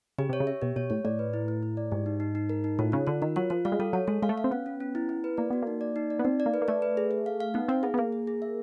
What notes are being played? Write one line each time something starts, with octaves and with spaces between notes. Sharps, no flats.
C#3 G4
C3 C#5
C#3
E5
B2 G4
B2 C#5
A2 C#5
A2 D5
B4
E4
E4
E4
D5
G#2 G4
D#4
D#4
D#4
A#4
D#4
A2 F4
C#3 F4
D3 F4
D#3 A#4
F#3 F4
F3 F4
G3 F5
G#3
G3 A4
F#3 C#5
G#3 A4
G#3 F5
A3
F5
C4
B3 C#4
C#4
C#4
E4
E4
B4
A#3 D5
B3 F#4
A#3 D#4
D5
D#4
D5
B3
C4 D#4
D5
A#3
B4
A#3
A3 D5
B4
G#4
G#4
F5
F5
B3 D#4
C4 F5
B3 G#4
B3
A#3 G#4
G#4
G#4
E5